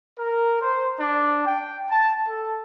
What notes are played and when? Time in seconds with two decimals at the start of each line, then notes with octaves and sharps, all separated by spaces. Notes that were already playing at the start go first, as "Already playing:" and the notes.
0.19 A#4
0.61 C5
0.99 D4
1.45 G5
1.90 A5
2.28 A4